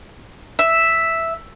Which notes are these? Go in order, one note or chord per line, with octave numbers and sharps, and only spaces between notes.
E5